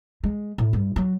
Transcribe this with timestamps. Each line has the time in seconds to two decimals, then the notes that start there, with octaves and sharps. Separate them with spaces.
0.24 G#3
0.58 A2
0.73 G2
0.96 F#3